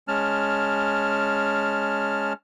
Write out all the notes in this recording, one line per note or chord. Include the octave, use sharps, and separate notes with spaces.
G#3 C#4 A5 F6